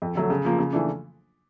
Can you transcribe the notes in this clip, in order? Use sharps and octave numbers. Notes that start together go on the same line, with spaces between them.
F2
D3 F#3 A3
C#3
F3 A#3
C#3
E3 A3 D4